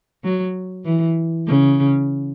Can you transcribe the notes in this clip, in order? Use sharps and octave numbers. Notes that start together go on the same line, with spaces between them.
F#3
E3
C#3